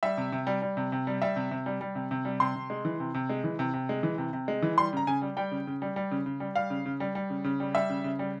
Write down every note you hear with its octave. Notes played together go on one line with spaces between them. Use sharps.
G3 E5
C3
C3
G3
G3
C3
C3
G3
G3 E5
C3
C3
G3
G3
C3
C3
G3
C3 C6
C3
G#3
E3
C3
C3
G#3
E3
C3
C3
G#3
E3
C3
C3
G#3
E3
G3 C6
C#3 A#5
C#3 G#5
G3
G3 G5
C#3
C#3
G3
G3
C#3
C#3
G3
G3 F5
C#3
C#3
G3
G3
C#3
C#3
G3
G3 E5
C#3
C#3
G3